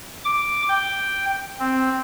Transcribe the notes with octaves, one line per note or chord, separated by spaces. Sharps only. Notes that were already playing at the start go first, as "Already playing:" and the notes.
D6
G5
C4